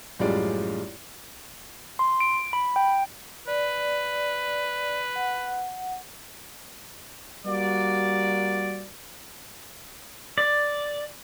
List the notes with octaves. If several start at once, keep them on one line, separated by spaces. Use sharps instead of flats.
A1 F#2 G3 G#3 F4 D5
C6
D7
B5
G5
B4 D5
F#5
G3 A#3 F#4 D5
D5